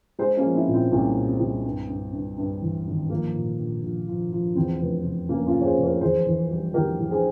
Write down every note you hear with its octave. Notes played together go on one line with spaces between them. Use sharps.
G#3 G#4 C5
A#3 C#4
F3
C4 E4
A#2
C4 E4
C2 A#3 C#4
A#2
C4
C2
G2
G2
G2
G2
E3
G#1
F3 A#3
A#2
A#1
A#1
F3
F3
E2 C4
F1
F1
F1 A#3 C#4
C#4 F4
F1
C#5
G#4 C5
F1
A#4 C#5
E2 G#4 C5
E3
G3
E2 G4 A#4
E3
G#4 C5